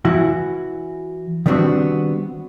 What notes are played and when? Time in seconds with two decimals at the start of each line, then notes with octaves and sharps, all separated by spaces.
0.05 E3 E4 F#4
1.46 D#3 G3 B3 C4 D4 F#4